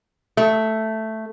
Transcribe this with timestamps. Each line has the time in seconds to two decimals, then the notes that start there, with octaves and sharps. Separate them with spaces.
0.37 A3